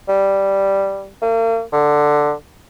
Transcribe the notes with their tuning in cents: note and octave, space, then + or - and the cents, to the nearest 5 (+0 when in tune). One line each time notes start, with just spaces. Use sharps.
G3 +0
A#3 -40
D3 +10